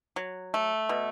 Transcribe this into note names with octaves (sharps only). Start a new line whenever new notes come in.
F#3
A3
B2